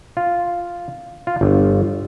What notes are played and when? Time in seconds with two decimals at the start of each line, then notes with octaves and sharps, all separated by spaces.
0.17 F4
1.27 F4
1.41 G1